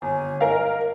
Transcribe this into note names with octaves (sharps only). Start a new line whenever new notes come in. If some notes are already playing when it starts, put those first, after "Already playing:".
G1 G#5
A#4 D#5 F5